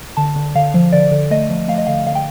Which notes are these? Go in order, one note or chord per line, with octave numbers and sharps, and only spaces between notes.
D3 A5
D3
D3 F5
F3
D3 D5
D3
A3 D#5
F3
A3 F5
D#5
D3 F5
D3 F5
G5